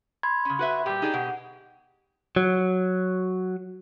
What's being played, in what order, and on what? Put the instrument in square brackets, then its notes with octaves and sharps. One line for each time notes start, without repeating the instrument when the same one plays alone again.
[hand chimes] B5 C6 G#6
[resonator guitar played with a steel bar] C#3 C#4
F#4 B4 E5
[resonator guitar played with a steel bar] A#2 G3 [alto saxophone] G4
[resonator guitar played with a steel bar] D#4 G#4 D5
[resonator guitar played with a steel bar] B2 [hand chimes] F#5
[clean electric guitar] F#3